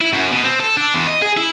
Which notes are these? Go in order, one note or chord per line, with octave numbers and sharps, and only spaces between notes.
E4
F#2
B2
C4
A4
D4
E2
D#5
G#4
E4